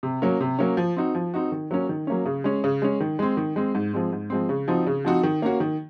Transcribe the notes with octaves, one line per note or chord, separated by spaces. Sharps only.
C3
F#3 A#3 C#4
C3
F#3 A#3 C#4
F3
C4 D#4 F#4
F3
C4 D#4 F#4
D#3
F#3 A#3 C#4
D#3
F#3 A#3 C#4
C#3
G#3 C#4
C#3
G#3 C#4
D#3
G#3 C4
D#3
G#3 C4
G#2
F3 G#3 C4
G#2
F3 G#3 C4
C#3
F3 C4 D#4 F#4
C#3
F3 C4 D#4 F#4
D#3
A#3 C#4 F#4
D#3